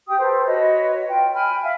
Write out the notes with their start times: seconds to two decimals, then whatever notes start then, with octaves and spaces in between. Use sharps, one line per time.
0.07 G4 G5 D#6
0.18 G4 A4 B4 C5
0.47 F#4 B4 C#5 D#5
1.09 F4 G5
1.33 G5 G#5 B5 F6
1.62 E5 F5